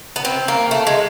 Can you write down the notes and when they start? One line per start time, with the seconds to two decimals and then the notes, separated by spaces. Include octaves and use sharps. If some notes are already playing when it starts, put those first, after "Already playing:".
0.16 B3
0.25 C4
0.48 A#3
0.71 A3
0.87 G#3